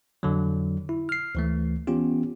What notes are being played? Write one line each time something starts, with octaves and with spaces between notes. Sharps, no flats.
F2 D3 F#3
E4
F6 C7
D2 E3 A3
E3 B3 C#4 F4 G4